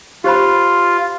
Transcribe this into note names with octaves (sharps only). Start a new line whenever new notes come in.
F4 G4 C5 B5